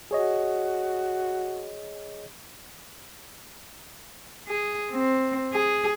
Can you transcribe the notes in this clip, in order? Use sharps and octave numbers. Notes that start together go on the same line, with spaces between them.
F#4 G#4 C#5 D#5
G#4
C4
G#4